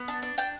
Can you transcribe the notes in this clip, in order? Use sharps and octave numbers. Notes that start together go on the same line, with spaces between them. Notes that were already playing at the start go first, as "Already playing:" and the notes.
Already playing: B3
D4 A5
D4
D4 G5